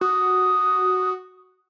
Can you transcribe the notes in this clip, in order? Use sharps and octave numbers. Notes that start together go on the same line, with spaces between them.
F#4 D#6